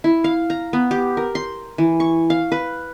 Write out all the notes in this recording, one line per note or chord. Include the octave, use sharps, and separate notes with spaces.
E4
F5
A#5
B3
G4
A#4
C6
E3
C#6
F5
B4